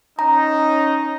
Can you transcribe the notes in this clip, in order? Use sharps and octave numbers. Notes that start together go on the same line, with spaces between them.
C#4 D#4 A#5